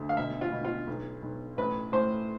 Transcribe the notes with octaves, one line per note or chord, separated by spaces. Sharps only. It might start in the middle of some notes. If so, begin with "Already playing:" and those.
Already playing: D2 D3
F5
B2 E5
F4
B2
F4
B1
B1
A1 B4
A2 C5